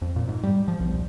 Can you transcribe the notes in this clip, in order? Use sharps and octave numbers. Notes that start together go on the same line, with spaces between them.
F2
A#2
G#2
G3
F3
B1
D#1